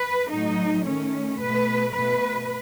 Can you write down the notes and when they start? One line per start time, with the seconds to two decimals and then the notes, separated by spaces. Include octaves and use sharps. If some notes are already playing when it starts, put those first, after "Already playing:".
Already playing: B4
0.30 A2 F#3 A3 D#4
0.85 D#3 A3 C#4
1.39 B2 A3 B4
1.94 B2 A3 B4